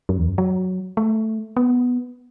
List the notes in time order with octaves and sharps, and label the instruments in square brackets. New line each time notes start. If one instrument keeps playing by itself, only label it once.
[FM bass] F#2
E2
F#2
F#3
A3
B3